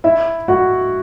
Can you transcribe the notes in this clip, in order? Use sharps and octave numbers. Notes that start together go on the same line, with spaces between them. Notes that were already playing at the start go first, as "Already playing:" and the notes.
E4 E5
F#4 F#5